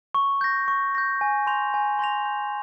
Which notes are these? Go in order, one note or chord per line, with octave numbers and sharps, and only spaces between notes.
C#6
G6 A#6
C#6
G6 A#6
G#5
C6 G6 A#6 F7
G#5
C6 G6 A#6 F7
G6